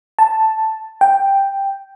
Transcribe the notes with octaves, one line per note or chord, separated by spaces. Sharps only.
A5
G5